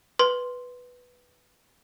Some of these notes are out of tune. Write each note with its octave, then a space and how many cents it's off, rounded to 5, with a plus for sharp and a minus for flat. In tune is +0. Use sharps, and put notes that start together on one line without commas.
B4 +0 C6 +0